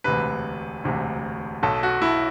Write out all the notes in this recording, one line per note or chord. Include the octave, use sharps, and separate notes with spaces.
E1 D2 C3 B4
E1 D2 C3
B1 B2 A4
F#4
E4